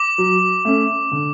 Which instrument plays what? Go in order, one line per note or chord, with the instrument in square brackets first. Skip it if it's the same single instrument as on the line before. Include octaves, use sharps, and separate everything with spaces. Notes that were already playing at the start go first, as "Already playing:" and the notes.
Already playing: [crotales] D6
[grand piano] F#3
A3 C#4
D3